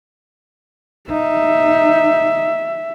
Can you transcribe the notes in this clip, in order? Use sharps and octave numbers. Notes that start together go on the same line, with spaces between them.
D#4 E5